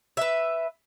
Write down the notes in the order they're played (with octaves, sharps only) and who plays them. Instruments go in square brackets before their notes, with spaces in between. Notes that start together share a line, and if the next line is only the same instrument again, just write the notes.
[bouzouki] B4 E5